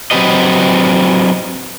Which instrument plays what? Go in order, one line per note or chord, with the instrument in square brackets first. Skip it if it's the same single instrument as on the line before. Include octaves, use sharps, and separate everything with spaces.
[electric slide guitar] F#3 C4 C#4 G4 B4 D#5